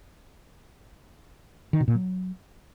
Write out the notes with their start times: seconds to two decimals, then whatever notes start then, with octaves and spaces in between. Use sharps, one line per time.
1.73 D#3
1.80 B2
1.88 A#2
1.95 F#3